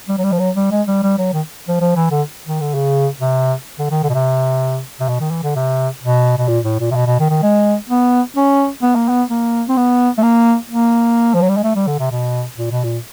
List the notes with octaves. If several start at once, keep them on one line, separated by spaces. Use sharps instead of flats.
G3
F#3
G3
F3
F#3
G3
G#3
G3
G3
F#3
D#3
F3
F3
E3
D3
D#3
D3
C#3
C3
D3
D#3
D3
B2
C3
C3
B2
D#3
E3
D3
C3
B2
B2
A#2
A2
A#2
C3
B2
B2
D#3
D#3
G#3
B3
C#4
B3
A#3
B3
A#3
C4
B3
A3
A#3
A#3
F3
F#3
G3
G#3
A3
G3
D3
C3
B2
A#2
B2
A#2